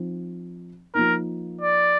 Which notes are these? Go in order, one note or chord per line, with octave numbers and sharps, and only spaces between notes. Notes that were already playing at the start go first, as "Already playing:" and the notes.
Already playing: F3 C4 D#4
F3 A#3 D#4 A#4
D5